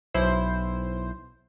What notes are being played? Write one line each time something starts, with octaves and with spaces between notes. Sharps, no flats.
B1 E4 C5